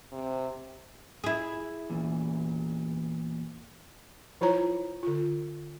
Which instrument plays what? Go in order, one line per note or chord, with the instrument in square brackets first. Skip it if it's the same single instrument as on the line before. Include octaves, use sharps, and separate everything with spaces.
[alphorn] C3
[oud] E4 G#4
[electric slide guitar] E2 A#2
[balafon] F3 E4 F4 C#5 A#5
D3 F4